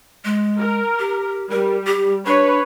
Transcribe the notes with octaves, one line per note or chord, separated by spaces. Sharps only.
G#3
A#4
G4
G3 A#4
G4
D4 B4 C#5